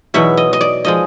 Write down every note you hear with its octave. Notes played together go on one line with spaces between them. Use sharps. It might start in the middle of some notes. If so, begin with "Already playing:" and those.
E2 B2 F#3 E5
D#5
D#5
D5
F3 G#3 D#5